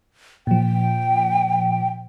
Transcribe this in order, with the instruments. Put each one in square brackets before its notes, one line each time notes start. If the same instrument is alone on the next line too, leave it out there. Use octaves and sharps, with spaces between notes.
[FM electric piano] A#2 F3 [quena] G5